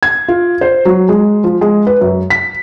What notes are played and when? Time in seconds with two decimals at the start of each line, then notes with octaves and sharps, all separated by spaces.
0.03 G#6
0.28 F4
0.61 C5
0.85 F#3
1.09 G#3
1.44 F3
1.61 G#3
1.87 B4
2.01 F#2
2.30 B6